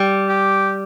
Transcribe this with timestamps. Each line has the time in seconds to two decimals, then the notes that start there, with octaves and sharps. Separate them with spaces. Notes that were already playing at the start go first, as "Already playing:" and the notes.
Already playing: G3
0.29 G4